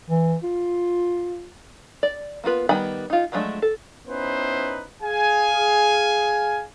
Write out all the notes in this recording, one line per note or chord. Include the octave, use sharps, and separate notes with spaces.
E3
F4
D5
A#3 B3 F4 B4
D#3 G3 B3 G#5 B5
D#4 F4
F3 F#3 G#3 A3 D4
A4
B3 C#4 D#4 E4 B4 C5
G#4 F5 G#5